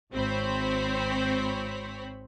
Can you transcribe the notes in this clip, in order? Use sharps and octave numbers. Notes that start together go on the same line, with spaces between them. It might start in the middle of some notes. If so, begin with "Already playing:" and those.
G#1 C4 C5 C#5 B5